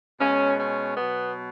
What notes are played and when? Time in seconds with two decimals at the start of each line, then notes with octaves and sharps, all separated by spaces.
0.20 B2 G#3 C#4
0.58 C#4
0.97 B2 F#3 B3